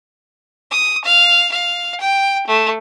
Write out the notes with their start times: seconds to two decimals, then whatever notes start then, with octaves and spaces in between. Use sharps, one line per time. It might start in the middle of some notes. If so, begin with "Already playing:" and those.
0.71 D#6
1.05 F5
1.52 F5
2.00 G5
2.47 A3